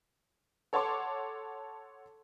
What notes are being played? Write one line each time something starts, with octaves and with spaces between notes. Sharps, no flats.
A4 C#5 F#5 A5 C6 D6